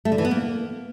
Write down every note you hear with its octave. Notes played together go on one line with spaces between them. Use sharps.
A3
D3
E3
B3
A#3